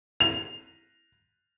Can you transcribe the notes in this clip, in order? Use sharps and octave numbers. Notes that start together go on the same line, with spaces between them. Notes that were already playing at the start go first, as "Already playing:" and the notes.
F7